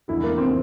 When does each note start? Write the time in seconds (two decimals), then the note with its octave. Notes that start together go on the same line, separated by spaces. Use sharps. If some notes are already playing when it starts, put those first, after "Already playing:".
0.08 F1 E2 D3 E4
0.23 A#3
0.38 C4